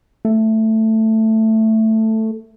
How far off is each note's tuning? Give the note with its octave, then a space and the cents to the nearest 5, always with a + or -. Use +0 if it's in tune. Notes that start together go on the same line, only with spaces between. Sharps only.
A3 +5